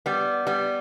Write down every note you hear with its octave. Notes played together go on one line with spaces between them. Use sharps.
G3 B3
G3 B3